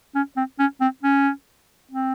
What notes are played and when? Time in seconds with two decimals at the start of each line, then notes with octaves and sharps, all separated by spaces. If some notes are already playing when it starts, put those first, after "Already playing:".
0.15 C#4
0.37 C4
0.59 C#4
0.81 C4
1.03 C#4
1.91 C4